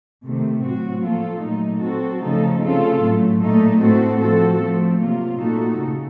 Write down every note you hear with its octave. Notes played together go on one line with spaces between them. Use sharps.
C3 D#3 A3
A2 F#3 C4 F#4
F3 A#3 F4 A4
A#2 F#3 A3 D#4
F#3 C4 F#4 A4
C#3 F3 A3 D#4 A4
C#3 A3 C4 F4 A4
A2 F#3 A3
A#2 A3 D#4 A4
A2 A3 C4 F#4 A4
F3 C4 F#4 A4
F3 A3 C4
C3 F#3 A#3 F4
A#2 A3 D#4 F#4 A4
C#3